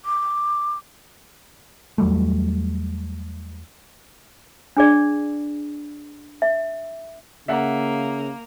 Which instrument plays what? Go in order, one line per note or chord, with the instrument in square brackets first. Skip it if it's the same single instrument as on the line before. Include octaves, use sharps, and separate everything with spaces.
[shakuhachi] D6
[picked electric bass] E2 F#3 G3 A3
[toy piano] D4 G#4 D5
E5
[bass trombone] C#3 [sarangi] A#3 [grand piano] E5 F#5